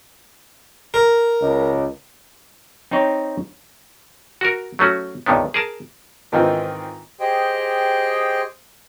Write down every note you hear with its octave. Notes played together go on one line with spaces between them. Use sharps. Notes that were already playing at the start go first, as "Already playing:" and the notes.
A#4
C#2
C4 D#4 C5 C#5 G5
F#4 A#4
F#3 A3 C#4 F#4
C#2 G2 C3 D#3 B3
G#4 A#4 A5
G#2 D#3 E3 C4 F4
G4 G#4 C5 D#5 G5